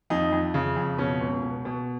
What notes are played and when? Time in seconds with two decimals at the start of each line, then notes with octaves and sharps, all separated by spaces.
0.10 F2 D#4
0.32 F2
0.54 C#3
0.76 F2
0.98 B2 C#4
1.21 C#2
1.43 B2
1.65 B2